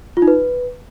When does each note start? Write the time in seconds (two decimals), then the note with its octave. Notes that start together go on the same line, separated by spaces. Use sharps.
0.17 F4
0.22 D#4
0.28 B4